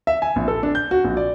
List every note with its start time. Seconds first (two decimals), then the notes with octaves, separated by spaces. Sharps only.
0.07 E5
0.22 G#5
0.36 A#1
0.48 A4
0.63 D4
0.75 G6
0.91 F#4
1.04 A#1
1.17 D5